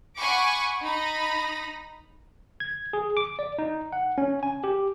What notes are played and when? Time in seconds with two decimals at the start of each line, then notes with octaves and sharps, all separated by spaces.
0.17 F#5 G#5 B5 C#6 D6
0.83 D#4 B5 A#6
2.60 G#6
2.93 G#4
3.17 D6
3.39 D5
3.58 D#4
3.93 F#5
4.18 C#4
4.43 G#5
4.64 G4